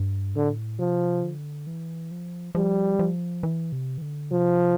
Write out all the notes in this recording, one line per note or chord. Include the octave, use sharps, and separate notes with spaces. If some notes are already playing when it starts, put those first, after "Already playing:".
Already playing: G2
A2 D3
C3 F3
D3
E3
F3
F3 G3
F3
E3
C3
E3
D3
C3 F3